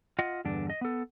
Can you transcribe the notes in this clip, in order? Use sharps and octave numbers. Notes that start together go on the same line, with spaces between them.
F4 D#5 F#5
E2 G2 D3 D4
D#5
B3 A4